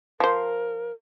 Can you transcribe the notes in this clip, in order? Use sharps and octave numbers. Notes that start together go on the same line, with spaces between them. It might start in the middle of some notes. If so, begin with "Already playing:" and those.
F3 A#4 C5